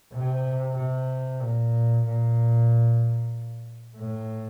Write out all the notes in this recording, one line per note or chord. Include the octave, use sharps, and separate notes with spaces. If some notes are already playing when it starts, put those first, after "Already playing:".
C3
C3
A#2
A#2
A2